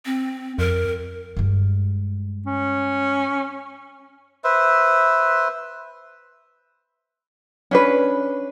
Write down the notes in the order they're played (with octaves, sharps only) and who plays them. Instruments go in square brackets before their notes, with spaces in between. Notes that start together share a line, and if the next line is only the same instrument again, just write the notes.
[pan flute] C4
[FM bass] F2 [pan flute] A#4
[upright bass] G2 G#3
[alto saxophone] C#4
[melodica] B4 C5 E5
[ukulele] C#4 D4 B4